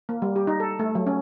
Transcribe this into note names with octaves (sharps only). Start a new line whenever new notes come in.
A#3
G3
G4
D#4
A4
A3
F#3
C#4